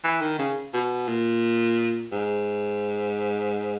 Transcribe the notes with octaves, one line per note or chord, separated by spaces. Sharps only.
E3
D#3
C#3
B2
A#2
G#2